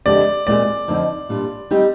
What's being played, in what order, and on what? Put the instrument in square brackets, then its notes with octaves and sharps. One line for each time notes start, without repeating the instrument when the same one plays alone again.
[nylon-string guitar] F2 D3 G#3 C4 G4 [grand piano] D5
[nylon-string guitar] A#2 G#3 C4 F4 G#4 [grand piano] D5
[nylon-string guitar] F2 D3 F3 C4 D#4
A#2 G3 D4 F4
G3 C4 D#4 G4